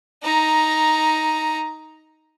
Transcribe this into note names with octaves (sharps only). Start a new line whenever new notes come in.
D#4 A#5